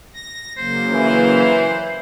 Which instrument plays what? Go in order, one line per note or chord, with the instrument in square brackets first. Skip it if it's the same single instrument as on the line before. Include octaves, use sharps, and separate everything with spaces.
[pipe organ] A#6
[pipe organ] C#3 F#3 A#3 [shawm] C5
[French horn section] E3